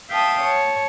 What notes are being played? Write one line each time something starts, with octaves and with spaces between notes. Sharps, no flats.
E5 F5 G5 A5 D#6
C#5 A5